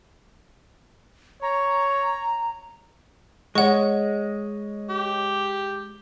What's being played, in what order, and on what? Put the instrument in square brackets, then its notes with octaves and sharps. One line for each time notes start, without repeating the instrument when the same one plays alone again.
[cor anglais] C#5 [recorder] A#5
[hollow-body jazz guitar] G#3 [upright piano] C#5 D#5 [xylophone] F#5 C#6
[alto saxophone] G4